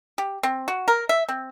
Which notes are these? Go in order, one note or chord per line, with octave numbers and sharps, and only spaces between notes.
G4
C4
F#4
A#4
E5
C4